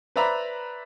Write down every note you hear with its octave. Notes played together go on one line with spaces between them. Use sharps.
B4 C5 D5 E5 A#5 B5